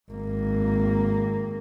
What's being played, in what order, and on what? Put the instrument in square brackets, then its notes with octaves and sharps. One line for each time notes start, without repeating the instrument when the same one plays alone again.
[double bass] G#1 A#3